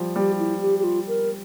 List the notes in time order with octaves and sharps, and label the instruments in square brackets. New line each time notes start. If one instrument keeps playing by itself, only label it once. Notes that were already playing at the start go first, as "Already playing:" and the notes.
Already playing: [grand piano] F3 G3
[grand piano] G3 [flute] G4
[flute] E4
G4
G4
F4
A#4